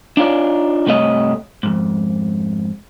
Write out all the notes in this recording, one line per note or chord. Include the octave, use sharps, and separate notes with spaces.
D4 D#4 F4 C#5 D5
C2 G2 C3 A3 C#5 D#5
F2 G#2